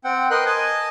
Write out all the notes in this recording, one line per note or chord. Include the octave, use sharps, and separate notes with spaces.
C4 F#5 G5
A#4 B4 D#5 G5 C6 F#6
D#5 G#5 A5